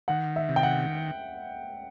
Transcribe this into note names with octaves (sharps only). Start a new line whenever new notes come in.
D#3 F#5
E5
C3
G5
F#5